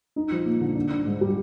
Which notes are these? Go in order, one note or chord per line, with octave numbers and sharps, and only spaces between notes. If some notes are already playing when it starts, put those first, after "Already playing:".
D#4
F3
A#3
D3
D4
D4
G#2
G3